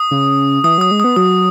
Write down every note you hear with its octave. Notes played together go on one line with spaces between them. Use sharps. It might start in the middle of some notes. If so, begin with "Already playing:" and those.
Already playing: D#6
C#3
E3 D#6
F#3 D#6
G#3
B3 D#6
F#3 D#6